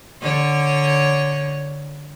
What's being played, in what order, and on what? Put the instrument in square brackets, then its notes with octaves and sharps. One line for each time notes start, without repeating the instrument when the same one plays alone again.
[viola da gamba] D3 C#5